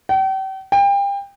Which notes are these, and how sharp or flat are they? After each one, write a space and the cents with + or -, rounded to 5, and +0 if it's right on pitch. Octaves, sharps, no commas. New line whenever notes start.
G5 -40
G5 +30